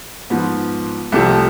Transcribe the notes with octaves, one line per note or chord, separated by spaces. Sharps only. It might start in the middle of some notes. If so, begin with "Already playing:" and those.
G#2 F3 B3
C2 C3 F3 A3